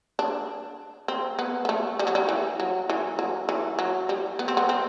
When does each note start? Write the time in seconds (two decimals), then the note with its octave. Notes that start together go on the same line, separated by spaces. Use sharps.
0.19 D4
1.08 C4
1.39 B3
1.65 B3
1.69 A3
1.99 G3
2.07 F#3
2.15 G3
2.29 E3
2.60 F#3
2.89 E3
3.19 F#3
3.49 E3
3.79 F#3
4.09 G3
4.39 B3
4.48 C4
4.57 B3
4.69 C4